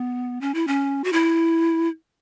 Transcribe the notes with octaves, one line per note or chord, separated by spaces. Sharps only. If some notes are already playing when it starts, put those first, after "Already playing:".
Already playing: B3
C#4
E4
C#4
F#4
E4